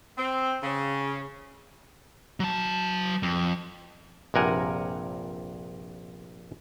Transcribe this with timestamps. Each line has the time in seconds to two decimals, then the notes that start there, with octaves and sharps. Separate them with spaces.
0.18 C4
0.63 C#3
2.40 F#3 A5
3.23 F2
4.34 A#1 G2 C3 A#4 F#5 G#5